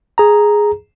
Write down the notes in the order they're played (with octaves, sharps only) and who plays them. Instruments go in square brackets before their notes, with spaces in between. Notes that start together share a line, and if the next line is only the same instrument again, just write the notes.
[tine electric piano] G#4 A#5